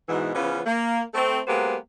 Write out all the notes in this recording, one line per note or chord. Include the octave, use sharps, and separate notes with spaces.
G#2 B2 E3
C#3 E3 F3 B3 C#4
A#3
A3 C4 A4
F#3 G#3 A#3 B3 G4 C5